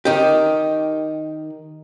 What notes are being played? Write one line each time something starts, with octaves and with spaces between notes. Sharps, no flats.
D#3 D#4 G4